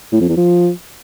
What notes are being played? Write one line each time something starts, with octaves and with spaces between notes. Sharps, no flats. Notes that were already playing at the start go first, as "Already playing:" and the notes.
A2
F2
E2
F3